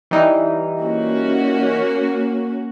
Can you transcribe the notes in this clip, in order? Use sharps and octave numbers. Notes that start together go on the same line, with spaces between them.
E3 G3 D#4
A#3 C#4 F#4